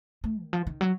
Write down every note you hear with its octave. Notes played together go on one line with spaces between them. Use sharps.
A3
D#3
F3
D#3
F#3